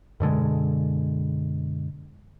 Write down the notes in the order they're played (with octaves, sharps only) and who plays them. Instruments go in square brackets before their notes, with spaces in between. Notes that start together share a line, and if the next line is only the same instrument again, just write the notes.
[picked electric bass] F#2 B2 D3 G#3